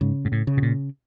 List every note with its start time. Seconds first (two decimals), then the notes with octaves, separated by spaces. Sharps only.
0.01 G#2 C#3
0.25 G#2
0.32 A2
0.47 C#3
0.57 B2
0.62 A#2